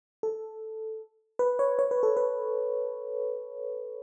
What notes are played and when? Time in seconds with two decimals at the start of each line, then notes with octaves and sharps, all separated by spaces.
0.23 A4
1.39 B4
1.59 C#5
1.79 C#5
1.91 B4
2.03 A4
2.17 B4